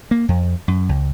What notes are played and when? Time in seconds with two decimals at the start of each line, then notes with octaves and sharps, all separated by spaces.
0.11 A#3
0.29 F2
0.68 F#2
0.89 C#2